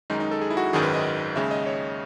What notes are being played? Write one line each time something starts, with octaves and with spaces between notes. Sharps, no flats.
F#2 D#3 G#3 D#4
D#4
A4
G#4
E4
F#4
G#1 F#2 D#3 F#3 G#4
B4
D#5
D#2 C#3 G#3 E5
D#5
C#5